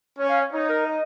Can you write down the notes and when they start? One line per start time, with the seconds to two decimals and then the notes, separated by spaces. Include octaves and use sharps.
0.18 C#4 C#5
0.29 F5
0.41 C#5
0.52 D#4 C#5
0.69 A#4
0.86 D#5